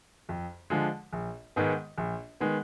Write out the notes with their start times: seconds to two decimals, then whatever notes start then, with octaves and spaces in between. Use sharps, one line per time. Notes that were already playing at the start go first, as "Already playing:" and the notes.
0.29 F2
0.70 D3 F3 G#3
1.13 A#1
1.56 G#2 D#3 G#3 B3
1.98 A#1
2.40 D#3 G#3 B3